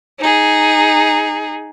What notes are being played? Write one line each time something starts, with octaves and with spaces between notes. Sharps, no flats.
D#4 G#4